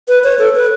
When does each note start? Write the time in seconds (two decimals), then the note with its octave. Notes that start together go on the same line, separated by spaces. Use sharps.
0.08 B4
0.24 C#5
0.39 A4
0.55 B4